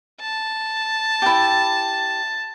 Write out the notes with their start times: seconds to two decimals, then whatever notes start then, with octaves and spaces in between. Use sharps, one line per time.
0.21 A5
1.22 E4 G4